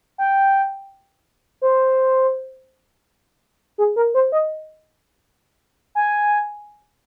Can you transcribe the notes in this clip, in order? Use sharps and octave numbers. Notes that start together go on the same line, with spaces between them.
G5
C5
G#4
A#4
C5
D#5
G#5